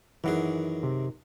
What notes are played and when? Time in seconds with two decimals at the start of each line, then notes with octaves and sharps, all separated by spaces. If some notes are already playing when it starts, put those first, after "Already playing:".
0.24 F#2 D#3 E3 G#4 F#5
0.83 C3